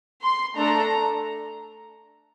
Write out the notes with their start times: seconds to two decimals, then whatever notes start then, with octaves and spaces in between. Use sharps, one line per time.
0.22 C6
0.57 A3 D4 A4 A#5